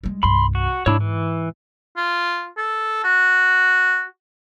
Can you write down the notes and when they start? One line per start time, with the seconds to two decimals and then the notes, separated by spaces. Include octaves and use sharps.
0.04 G3 G#3
0.23 C2 G2 B5 C6
0.55 F#4
0.86 G#2 D4 E4 C#5
1.00 E3
1.97 F4
2.57 A4
3.04 F#4